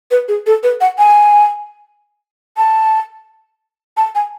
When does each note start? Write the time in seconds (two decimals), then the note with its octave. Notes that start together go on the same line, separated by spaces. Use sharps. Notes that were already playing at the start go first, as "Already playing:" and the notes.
0.11 B4
0.28 G#4
0.46 A4
0.63 B4
0.81 F#5
0.98 G#5
2.57 A5
3.97 A5
4.15 G#5